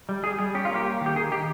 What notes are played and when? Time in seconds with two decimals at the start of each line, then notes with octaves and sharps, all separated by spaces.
0.09 G3
0.23 G3 G#4
0.39 G3 G#4
0.55 C#4 G4
0.65 A#3 F4
0.76 G4
0.85 A#3
1.01 D#3 G4
1.16 D#3 G#4
1.31 D#3 G4